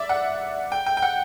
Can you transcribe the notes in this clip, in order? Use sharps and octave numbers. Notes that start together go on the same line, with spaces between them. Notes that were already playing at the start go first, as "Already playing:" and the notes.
Already playing: D5 E5
F#5
G5
G5
G5
F#5